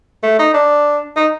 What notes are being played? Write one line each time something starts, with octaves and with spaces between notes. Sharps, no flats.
A3
D#4
D4
D#4